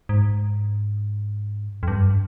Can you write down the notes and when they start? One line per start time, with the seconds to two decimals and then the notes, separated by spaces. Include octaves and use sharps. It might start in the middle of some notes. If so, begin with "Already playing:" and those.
0.09 G#2
1.83 F2
1.88 G2